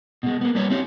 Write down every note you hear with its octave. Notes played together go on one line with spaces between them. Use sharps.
B2 G#3
A#3 B3
G3 A#3 D4 B4 C#5
C4 E4 G4 C#5